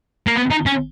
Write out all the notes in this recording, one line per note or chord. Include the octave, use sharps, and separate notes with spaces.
A#3
B3
D#4
C#4